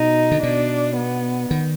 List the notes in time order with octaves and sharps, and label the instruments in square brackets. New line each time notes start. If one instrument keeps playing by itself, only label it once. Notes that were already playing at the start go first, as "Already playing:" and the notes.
Already playing: [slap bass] B2 [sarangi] D#4
[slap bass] D3
[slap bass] B2 [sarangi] D4
[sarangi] B3
[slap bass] D#3